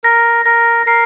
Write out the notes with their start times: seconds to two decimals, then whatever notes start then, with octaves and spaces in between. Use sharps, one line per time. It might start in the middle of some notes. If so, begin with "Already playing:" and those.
0.04 A#4 A#6
0.45 A#4 A#6
0.86 A#4 C7